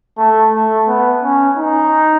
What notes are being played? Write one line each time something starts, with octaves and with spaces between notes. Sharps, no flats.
A3
A3
B3
C#4
D#4